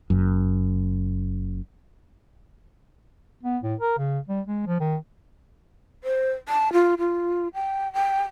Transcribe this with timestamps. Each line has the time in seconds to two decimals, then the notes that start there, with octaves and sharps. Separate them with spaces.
0.10 F#1 F#2
3.43 B3
3.63 A2
3.80 A#4
3.98 C#3
4.28 G3
4.47 G#3
4.67 F3
4.80 D#3
6.04 C5
6.48 A5
6.73 F4
6.98 F4
7.54 G5
7.93 G5